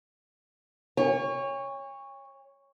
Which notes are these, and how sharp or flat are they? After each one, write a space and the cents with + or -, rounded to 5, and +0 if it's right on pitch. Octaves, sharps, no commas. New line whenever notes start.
C#5 +0 G#5 -45